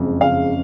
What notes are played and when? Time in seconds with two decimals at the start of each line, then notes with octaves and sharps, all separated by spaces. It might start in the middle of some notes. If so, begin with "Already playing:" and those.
Already playing: F#1 F2 G#3
0.21 C#3 F5